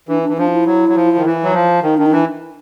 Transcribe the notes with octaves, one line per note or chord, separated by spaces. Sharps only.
E3 D4
D4
E3
F3 D4
E4
F#3
F#3
F3
D#3
E3
F#3
F3
D#3 D#4
D#3 D4
D#4
E3 D4